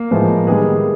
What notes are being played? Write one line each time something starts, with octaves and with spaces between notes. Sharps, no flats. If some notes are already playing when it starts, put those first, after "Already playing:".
Already playing: A#3 A#4
A2 F3 G#3 B3
D#3 G3 G#3 B3 G#4